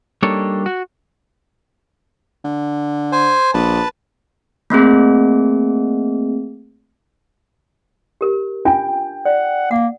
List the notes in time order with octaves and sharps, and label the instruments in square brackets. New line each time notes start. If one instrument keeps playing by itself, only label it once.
[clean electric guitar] G3 A#3 D4 D#4 A4 C#5
F#4
[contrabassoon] D3
[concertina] C5 G#5
[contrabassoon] A#1 [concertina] B4 A5
[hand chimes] A3 A#3 C4 G#4
[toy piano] G4 A#4
[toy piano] D4 F4 G#5 [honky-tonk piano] G5
[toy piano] D5 [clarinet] F#5
[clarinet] A#3 [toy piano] F#5